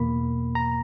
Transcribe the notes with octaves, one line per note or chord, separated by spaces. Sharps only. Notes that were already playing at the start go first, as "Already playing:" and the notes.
Already playing: E2 B2 A#3 B5
A#5